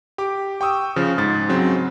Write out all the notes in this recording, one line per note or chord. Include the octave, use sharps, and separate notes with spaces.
G4 D6
G5 C#6 D#6 E6
C#3 F3
G#2 A6
C#3 F#3 C4